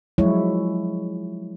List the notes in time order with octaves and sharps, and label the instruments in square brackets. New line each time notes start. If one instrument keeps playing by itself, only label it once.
[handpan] F3 F#3 G#3 E4 C#5